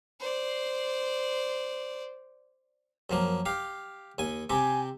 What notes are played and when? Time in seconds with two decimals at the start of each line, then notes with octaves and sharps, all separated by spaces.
0.20 C5 D5
3.10 F#2 F3 A#3
3.46 G4 F5
4.18 D#2 G#5
4.50 C3 C4 G4 G#5